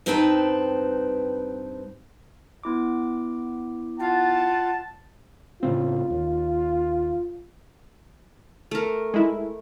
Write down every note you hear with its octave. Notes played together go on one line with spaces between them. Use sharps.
G2 C4 D#4 B4 G5 A5
B3 E4 D6
F4 F#5 A5
A2 C#3 C4 F4
D#2
A3 A#4
G#3 E4